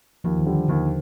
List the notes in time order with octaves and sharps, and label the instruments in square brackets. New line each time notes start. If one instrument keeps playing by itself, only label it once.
[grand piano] D#2 [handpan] F3
[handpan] D#3
[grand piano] D3 G3
[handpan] D#3
[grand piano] D#2 [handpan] D3